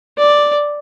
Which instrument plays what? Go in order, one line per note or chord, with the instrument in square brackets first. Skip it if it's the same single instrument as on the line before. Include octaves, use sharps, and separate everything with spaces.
[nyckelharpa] D5